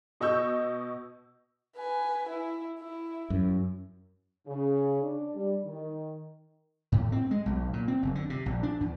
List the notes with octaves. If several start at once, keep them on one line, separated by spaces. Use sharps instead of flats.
B2 D#5 C#6 E6 G6
B4 G#5
E4
E4
F#2
C#3
D4
G3
D#3
A2
C4
G#3
B1
A#2
C4
F#1
D3
C3
A#1
D4
E2